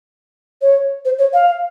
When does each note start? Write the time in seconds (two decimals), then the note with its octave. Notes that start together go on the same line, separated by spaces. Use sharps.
0.62 C#5
1.05 C5
1.18 C#5
1.33 F5